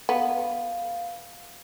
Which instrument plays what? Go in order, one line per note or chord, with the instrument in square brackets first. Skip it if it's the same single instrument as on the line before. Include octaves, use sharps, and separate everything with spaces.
[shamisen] B3 [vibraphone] F5